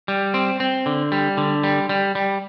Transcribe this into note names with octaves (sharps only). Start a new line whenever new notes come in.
G3
C4
C4
D3
G3
D3
G3
G3
G3